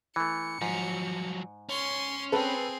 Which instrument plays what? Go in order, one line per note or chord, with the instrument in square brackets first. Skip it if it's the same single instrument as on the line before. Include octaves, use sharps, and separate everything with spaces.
[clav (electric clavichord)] E3 A3 [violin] C#7
[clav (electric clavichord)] G#2 [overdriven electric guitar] F3 F#3
[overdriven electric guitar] C#4 [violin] C6 C#6
[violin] C4 G#4 [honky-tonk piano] A4 B4